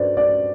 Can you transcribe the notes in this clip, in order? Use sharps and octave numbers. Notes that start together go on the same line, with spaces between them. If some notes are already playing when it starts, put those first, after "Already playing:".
Already playing: G2 F#4 A4 B4 C5 D5
D5